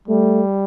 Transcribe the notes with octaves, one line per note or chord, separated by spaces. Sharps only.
G3 A3